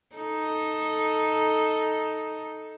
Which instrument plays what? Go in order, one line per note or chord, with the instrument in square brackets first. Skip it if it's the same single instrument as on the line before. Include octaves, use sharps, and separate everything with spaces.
[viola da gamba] D#4 A4